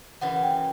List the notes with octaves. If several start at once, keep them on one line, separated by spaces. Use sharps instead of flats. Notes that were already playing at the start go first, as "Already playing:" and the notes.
F#2 C#3 E3 F#5
G5